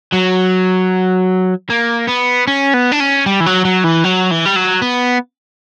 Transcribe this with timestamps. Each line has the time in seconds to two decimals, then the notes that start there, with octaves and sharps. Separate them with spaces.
0.14 F#3
1.70 A#3
2.08 B3
2.47 C#4
2.74 B3
2.92 D4
3.00 C#4
3.26 G3
3.40 E3
3.46 F#3
3.65 F#3
3.84 E3
4.04 F#3
4.31 E3
4.45 G3
4.56 F#3
4.82 B3